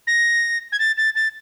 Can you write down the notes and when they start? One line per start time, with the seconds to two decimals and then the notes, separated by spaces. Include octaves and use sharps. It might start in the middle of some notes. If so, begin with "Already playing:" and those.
0.07 A#6
0.72 G#6
0.79 A6
0.97 A6
1.15 A6